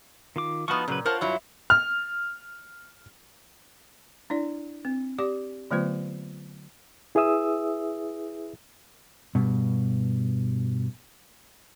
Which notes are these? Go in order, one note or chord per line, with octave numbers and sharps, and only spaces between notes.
D#3 F4 D6
F3 B3 D#4 F#4 C#6
A#2 C#3 F#3 B4
F4 A#4 C5 C#5 F#5 A5
G2 F#3 E4
F6
D4 E4 D5
C4
G4 D5 D6
D3 F#3 A3 B3 F4 C5
E4 G#4 B4 E5 D#6 E6
G2 B2